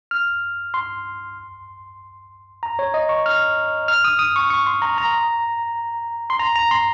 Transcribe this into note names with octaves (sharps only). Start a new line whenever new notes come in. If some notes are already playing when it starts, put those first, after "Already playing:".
F6
C6
A#5
C#5
D#5
C#6
F6
F6
D#6
D#6
C#6
C#6
C6
A#5
A#5
C6
A#5
A#5
C6